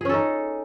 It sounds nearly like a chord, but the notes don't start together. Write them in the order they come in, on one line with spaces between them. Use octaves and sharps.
G#4 C#4 A4 D#4